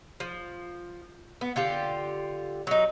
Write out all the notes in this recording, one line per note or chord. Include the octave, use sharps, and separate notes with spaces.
F3
B3
D3 F4 G4
F#3 D#4